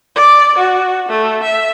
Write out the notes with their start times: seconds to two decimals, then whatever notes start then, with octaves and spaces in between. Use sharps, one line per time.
0.15 D5
0.58 F#4
1.09 A3
1.43 E5